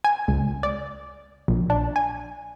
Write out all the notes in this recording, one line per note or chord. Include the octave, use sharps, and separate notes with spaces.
G#5
C#2
D5
A#1
D4
G#5